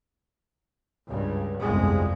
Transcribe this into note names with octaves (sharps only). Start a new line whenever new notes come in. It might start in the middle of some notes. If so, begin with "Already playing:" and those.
C#2 G2
G1 C2 F2 G#3